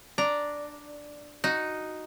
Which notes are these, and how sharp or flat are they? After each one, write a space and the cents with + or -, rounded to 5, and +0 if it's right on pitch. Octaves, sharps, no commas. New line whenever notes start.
D4 +0 D5 +0 A#5 +0
D#4 +0 F#4 +0